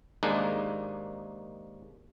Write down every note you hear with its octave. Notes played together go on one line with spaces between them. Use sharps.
D#2 G#2 G#3 A#3 D4 D#4